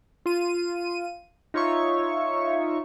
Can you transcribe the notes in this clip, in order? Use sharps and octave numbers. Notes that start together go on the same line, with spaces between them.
F4 D#7
D#4 F4 C#5 E5 C#6